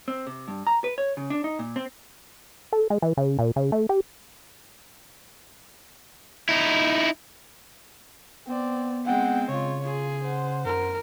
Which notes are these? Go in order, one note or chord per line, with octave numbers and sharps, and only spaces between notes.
C4
C3
G2
A#5
B4
C#5
C#3
D4
D#4
A#2
C4
A4
G#3
E3
C#3
A#2
C#3
A3
G4
D#4 E4
B3 C4 D5
G#3 C4 F#5 G5
C#3 F4 C#5
F4 G#4
C5 F#5
F#2 A#4